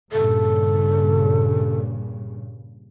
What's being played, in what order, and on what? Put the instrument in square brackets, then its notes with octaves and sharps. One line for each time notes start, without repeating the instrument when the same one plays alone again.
[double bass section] G2 A#2 C#3 [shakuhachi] A4